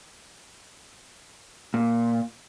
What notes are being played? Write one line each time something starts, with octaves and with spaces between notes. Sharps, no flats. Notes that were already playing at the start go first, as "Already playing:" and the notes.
A#2